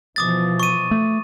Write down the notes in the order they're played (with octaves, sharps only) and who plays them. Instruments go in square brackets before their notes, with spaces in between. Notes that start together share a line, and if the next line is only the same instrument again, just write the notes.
[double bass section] B2 E3 F3 [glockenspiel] D6 D#6 A6
[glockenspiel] C#6 D#7
[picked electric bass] A3